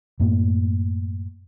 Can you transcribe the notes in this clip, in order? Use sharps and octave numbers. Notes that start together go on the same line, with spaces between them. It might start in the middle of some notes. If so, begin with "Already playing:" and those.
F#2 A2 A#3